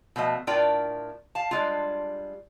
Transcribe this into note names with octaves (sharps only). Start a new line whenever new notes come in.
B2 F3 A3 D#5
A2 D4 F4 A#4 D5 G5
F5 A5
G3 G#3 D4 F4